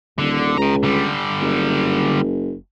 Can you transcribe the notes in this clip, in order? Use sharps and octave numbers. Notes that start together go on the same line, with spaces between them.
D#1 D3
C#2 G5 A#5
D3 G3
F#1